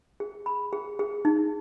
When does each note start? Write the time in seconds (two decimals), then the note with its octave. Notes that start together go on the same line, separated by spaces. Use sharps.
0.20 G#4
0.46 B5
0.73 G#4
0.99 G#4
1.25 D#4